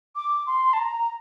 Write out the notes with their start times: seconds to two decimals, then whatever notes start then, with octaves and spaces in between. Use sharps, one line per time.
0.16 D6
0.47 C6
0.73 A5
0.79 A#5